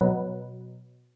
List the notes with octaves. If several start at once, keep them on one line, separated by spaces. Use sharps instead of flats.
B2 F#3